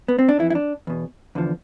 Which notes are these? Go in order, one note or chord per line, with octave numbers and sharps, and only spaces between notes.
B3
C4
D4
F2 E3 E4
E4
D4
E2 B2
E2 D3 F3